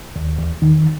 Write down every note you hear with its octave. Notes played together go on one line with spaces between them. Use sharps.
D#2
E2
D#3